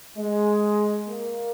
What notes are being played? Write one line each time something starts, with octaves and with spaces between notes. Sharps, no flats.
G#3
A#3